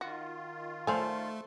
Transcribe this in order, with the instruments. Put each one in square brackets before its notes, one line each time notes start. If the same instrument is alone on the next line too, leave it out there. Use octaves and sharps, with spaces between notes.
[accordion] D#3 F4 [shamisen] F#4
[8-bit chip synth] A3 [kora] A4 C5 [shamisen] D5 F5 G#5